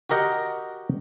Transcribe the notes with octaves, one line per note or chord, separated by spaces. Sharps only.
F#4 G4 A#4 D#5 F#5 G5